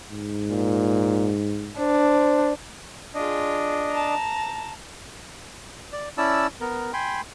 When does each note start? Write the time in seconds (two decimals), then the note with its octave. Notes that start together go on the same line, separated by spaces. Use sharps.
0.11 G#2
0.49 A#2
1.79 D4 C5
3.15 D4 F4 G#4 D#5
3.91 A5 A#5
5.93 D5
6.18 C#4 E4 D5 A5 E6
6.61 B3 A#4
6.93 G5 G#5 B5 C6